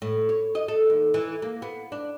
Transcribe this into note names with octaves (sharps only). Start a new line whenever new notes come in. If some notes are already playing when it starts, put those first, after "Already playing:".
A2
C#5
D#5
A4
D#2
E3
A#3
B3
D4